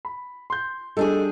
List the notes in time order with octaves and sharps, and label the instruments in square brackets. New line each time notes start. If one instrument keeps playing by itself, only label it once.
[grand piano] B5
C6 G6
[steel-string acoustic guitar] G3 D4 G#4 [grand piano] A4 D#5